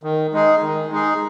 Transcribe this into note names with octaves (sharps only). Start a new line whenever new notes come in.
D#3
G#3 D#4 G#4
D#3
G#3 D#4 G#4